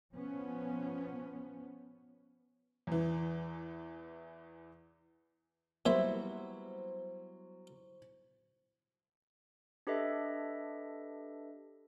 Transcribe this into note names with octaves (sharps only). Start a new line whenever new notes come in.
F3 B3 C#4
E2 E3
A#2 F#3 G3 B3 E4 C5 E5 C6
D4 G4 A4 B4 D#5 E5